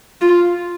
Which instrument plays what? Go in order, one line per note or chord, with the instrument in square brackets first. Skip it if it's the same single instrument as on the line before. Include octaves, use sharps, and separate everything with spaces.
[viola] F4